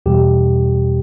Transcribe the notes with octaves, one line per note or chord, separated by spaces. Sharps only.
E2 B2 G3 G4